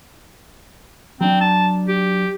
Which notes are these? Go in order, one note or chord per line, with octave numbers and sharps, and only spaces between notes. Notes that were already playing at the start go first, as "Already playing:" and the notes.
F#3 C4 D4
A5
G4